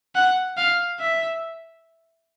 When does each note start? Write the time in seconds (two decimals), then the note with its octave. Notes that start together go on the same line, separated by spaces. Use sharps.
0.15 F#5
0.57 F5
1.00 E5